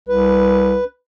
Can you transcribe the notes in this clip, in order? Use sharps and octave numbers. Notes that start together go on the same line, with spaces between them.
C2 B4